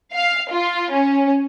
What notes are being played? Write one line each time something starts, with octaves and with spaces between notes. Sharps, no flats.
F5
F4
C#4